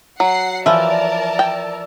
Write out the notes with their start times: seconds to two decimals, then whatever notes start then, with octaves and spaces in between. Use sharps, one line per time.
0.20 F#3 F#5 C7
0.66 E3 F3 A#4 D5 E5 A5
1.39 G5